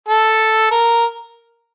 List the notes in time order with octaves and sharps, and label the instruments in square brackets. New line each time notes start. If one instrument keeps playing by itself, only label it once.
[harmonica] A4
A#4